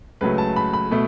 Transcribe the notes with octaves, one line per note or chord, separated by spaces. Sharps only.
C#2 C#3 F#3 A3 B4
A5
B5
B5
B2 A3